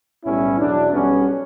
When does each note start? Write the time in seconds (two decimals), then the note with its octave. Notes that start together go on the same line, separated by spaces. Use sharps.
0.24 B1 A2 G3 B3 C#4 E4
0.58 E2 B2 F#3 D4
0.92 B1 B2 G3 B3 C#4